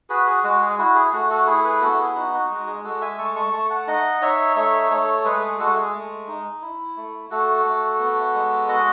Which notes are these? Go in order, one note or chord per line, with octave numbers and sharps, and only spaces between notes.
F#4 G#4 B4
G#4
G#3 F#4
G#4
E4 F#4
G#4
A3 F#4
F#4 A4
E4 G#4
G#4 B4
B3 F#4 A4
G#4
D#4 F#4
F#4
G#3 F#4
G#4
G#3 F#4 A4
E5 G#5
A3 A5 C#6
A5 C#6
A3 A5 C#6
F#5 A5
D#4 D#5 F#5
D#4 C#5 E5
A3 C#5 E5
A3 A4 C#5
G#3 G#4 B4
G#4
G#3 F#4 A4
G#4
A3
D#4
E4
A3
A3 F#4 A4
A3
B3
G#3
F#4 D#5 F#5